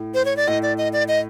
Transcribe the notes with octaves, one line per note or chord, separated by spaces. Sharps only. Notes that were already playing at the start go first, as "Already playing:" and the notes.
Already playing: A2
C5
C#5
D5
A2 D#5
D5
D#5
D5
D#5